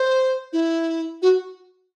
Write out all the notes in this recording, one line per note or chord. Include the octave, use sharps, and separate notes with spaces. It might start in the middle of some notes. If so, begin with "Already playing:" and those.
Already playing: C5
E4
F#4